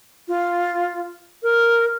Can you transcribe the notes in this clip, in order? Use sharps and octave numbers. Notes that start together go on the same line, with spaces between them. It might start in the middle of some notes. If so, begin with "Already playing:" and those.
F4
A#4